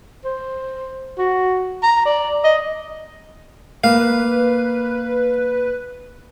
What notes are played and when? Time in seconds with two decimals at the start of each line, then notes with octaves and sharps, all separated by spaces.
0.24 C5
1.18 F#4
1.83 A#5
2.05 D5
2.44 D#5
3.84 A#3 B4 F5